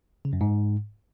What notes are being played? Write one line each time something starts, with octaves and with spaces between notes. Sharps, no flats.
C#3
F#2
G#2